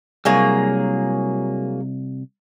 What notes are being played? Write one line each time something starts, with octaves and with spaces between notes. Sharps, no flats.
C2 F#3 A#3 G#4